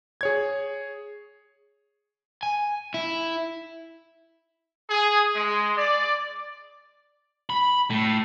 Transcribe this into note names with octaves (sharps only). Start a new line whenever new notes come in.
G#4 C#5 G#6
G#5
E4
G#4
G#3
D5
B5
A2